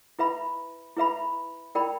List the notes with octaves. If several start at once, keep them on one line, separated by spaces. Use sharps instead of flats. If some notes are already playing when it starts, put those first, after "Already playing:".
E4 B4 E5 B5
E4 B4 E5 B5
E4 A#4 D5 G5 B5